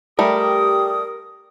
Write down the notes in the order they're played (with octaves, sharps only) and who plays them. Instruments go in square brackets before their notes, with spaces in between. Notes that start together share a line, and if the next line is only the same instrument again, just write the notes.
[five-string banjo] G3 A3 [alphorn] G4 [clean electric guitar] A#4 [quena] D#6